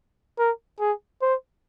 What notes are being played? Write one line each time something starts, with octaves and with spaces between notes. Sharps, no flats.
A#4
G#4
C5